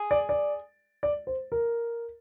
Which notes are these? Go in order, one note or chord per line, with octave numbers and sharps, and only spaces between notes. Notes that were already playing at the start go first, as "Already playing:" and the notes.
Already playing: G#4
D5
D5
D5
C5
A#4